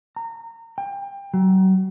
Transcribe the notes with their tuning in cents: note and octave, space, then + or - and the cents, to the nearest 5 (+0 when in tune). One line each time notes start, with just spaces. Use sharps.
A#5 -25
G5 +25
F#3 +35